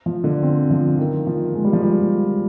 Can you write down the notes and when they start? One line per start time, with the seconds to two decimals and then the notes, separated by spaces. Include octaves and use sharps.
0.06 F3
0.24 D3
0.43 C4
0.70 F3
0.99 D#3
1.27 F3
1.55 G#3
1.65 G3
1.73 F3
1.83 G3